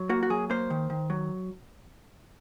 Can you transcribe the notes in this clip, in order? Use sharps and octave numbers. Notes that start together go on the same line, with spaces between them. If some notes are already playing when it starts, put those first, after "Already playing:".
Already playing: F#3
A#3 F#4
F#4
F#3 G#4
A#3 C5
D#3
D#3
F#3